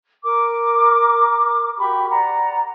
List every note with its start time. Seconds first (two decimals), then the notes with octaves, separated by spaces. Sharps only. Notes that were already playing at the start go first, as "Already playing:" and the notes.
0.24 A#4 D6
1.78 F#4 G4 B5 C#6
2.09 D5 F#5 A#5